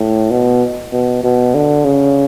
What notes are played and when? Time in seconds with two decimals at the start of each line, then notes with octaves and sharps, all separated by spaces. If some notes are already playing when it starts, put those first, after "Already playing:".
Already playing: A2
0.31 B2
0.92 B2
1.24 B2
1.54 D3
1.85 C#3